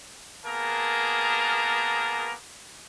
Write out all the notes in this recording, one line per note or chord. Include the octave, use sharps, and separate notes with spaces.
A#3 B3 G#4 A#4 A5